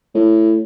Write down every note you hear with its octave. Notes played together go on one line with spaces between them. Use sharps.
A2